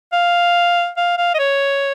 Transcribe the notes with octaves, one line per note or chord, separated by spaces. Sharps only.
F5
F5
F5
D#5
C#5